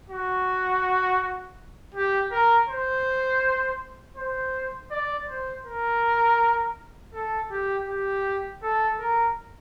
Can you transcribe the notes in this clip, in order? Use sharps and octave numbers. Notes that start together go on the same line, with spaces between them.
F#4
G4
A#4
C5
C5
D5
C5
A#4
A4
G4
G4
A4
A#4